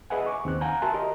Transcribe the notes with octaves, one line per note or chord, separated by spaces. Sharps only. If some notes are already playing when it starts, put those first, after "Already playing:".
G#4 B4 D#5 E5 F#5 G#5
C#6 D6
D#2 C4 F#6
F5 F#5 G#5 A#5 F#6 G6
F#4 A#4 E5 A5 C6
G4 A#4 D#5